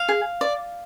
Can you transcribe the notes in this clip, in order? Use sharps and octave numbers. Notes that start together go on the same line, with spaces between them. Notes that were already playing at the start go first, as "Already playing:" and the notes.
Already playing: F5
G#4
D5